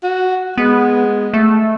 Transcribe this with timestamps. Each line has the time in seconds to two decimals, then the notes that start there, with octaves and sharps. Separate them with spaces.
0.03 F#4
0.58 G#3 B3
1.33 A3